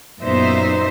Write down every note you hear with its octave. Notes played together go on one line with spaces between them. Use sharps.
F#2 A#2 B3 D#4 C5 E5